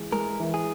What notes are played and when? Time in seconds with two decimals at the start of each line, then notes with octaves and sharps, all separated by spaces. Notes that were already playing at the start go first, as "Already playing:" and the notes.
Already playing: E3 G#3
0.12 G#3 A#4
0.40 E3
0.54 G#4